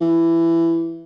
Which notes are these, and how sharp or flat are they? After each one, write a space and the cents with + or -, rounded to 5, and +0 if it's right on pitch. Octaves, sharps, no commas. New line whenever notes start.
E3 +15